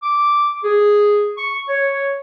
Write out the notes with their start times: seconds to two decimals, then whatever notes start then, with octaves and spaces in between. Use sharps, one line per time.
0.03 D6
0.64 G#4
1.38 C#6
1.69 C#5